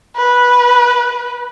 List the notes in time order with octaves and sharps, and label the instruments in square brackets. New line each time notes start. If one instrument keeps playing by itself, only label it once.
[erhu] B4